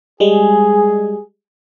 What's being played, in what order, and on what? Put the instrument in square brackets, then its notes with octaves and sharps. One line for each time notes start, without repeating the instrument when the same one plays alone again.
[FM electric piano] G3 G#3 [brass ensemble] G#4